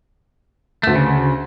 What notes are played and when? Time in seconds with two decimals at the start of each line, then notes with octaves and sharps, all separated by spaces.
0.83 D2 A3 E7
0.95 C#3